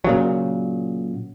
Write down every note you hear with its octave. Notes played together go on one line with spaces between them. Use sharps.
A#2 C#3 F#3